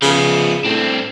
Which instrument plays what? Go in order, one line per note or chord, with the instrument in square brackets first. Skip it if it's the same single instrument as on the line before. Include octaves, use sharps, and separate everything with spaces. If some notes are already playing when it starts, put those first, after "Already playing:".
[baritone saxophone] C#3 [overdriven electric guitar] F3 B3
[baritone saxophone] A2 [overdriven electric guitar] C4 D4